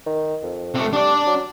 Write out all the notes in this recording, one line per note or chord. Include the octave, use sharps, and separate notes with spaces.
D#3
F2
C3 A3
G3 D4 D5
F#3